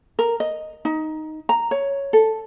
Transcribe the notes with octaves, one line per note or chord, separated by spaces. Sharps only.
A#4
D#5
D#4
A#5
C#5
A4